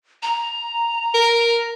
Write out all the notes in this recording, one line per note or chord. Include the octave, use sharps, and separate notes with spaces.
A#5
A#4